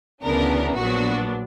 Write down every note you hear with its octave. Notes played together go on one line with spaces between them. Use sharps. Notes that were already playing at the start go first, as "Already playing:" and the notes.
D2 C#3 E3 B3 D4 A#4
A#1 A#2 F#3 B3 D4 F#4